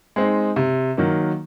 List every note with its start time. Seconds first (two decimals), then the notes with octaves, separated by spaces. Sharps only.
0.16 G#3 C4 D#4
0.56 C3
0.97 D#3 F#3 A#3